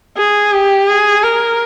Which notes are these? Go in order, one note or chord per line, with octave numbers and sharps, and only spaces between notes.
G#4
G4
G#4
A#4